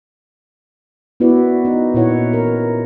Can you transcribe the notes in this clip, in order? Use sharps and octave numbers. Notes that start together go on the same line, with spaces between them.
B3 E4 F#4 B4 D5
D#4
A#2 E4 C#5 F#5
E3 A#4